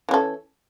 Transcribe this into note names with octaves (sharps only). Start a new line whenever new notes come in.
E3 C#4 A4